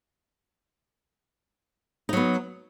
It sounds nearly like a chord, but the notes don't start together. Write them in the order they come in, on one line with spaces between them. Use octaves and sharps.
D#4 F#3 B3